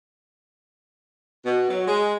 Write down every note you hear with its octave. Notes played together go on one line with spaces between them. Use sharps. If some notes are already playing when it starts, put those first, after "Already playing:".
B2
F#3
G#3